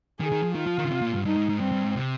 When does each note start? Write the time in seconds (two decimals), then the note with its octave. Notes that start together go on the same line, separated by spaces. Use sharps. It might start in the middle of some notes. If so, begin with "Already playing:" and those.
0.20 D#3 G#4
0.32 D#3
0.43 F3
0.55 D#3 F4
0.67 F3
0.78 D#3
0.84 C#3
0.90 C3
1.01 A#2
1.13 G2
1.25 G2 D#4
1.37 G#2
1.49 G#2
1.60 G2 C4
1.72 G2
1.84 G#2
1.95 C3